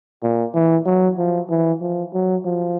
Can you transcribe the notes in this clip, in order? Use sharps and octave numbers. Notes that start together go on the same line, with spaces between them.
A#2
E3
F#3
F3
E3
F3
F#3
F3